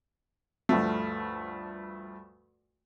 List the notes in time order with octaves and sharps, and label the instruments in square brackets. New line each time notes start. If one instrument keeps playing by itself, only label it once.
[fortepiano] D2 G2 F3 A3